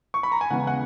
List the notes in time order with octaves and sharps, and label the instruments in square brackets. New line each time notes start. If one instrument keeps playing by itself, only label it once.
[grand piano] C#6
B5
A#5
G#5
C#3 E3 G#3 B3 F#5
F#5